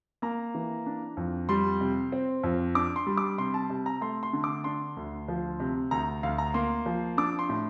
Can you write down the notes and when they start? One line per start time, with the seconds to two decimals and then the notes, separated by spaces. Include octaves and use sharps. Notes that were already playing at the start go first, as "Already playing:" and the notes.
0.22 A#3 A#5
0.55 E3
0.86 D4
1.17 F2
1.49 G3 C6
1.81 C3
2.12 C4
2.43 F2
2.75 D4 D6
2.96 C6
3.07 G3
3.17 D6
3.38 C3 C6
3.54 A5
3.70 C3
3.86 A#5
4.01 A3 C6
4.23 C6
4.33 D3
4.44 D6
4.64 D4 C6
4.97 D2
5.28 F3
5.60 C3
5.91 D2 A#5
6.23 D2 F5
6.38 A#5
6.54 A#3 C6
6.86 F3
7.17 D4 D6
7.39 C6
7.49 A2